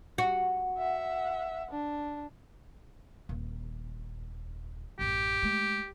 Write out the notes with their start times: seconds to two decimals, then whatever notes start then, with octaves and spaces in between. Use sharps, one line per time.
0.18 F#4
0.78 E5 F#5
1.71 D4
3.29 D#1
4.99 A1 F#2 G4
5.43 G#3 A3